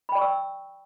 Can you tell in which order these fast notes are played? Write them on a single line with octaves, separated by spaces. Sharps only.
B5 G5 D5 C#6 E6